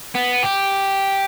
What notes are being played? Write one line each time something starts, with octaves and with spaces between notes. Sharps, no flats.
B3
G4